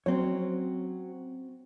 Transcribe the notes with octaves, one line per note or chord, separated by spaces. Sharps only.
F#3 C4 C#4 C#5